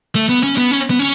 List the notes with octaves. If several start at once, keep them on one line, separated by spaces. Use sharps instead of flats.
A3
B3
C#4
B3
C#4
B3
C#4